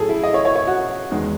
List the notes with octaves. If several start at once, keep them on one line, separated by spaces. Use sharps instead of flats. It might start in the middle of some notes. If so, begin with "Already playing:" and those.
Already playing: A2 F#3 A3 G#4 A4
E4
D#5
C#5
C#5
C#5
F#4
E2 D#3 G#3